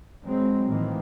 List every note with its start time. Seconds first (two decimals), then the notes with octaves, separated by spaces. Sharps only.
0.24 F#3 G#3 C4
0.67 A2 D#3 E3 A#3